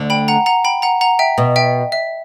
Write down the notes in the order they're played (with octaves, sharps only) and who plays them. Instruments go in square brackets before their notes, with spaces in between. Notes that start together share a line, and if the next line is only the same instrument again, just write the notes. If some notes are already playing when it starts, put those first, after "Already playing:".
Already playing: [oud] D2 D3
[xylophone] G5 B5
F#5 A#5
F#5 A#5
G5 B5
F#5 A#5
F#5 A#5
E5 G5
[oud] B2
[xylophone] E5 G5
E5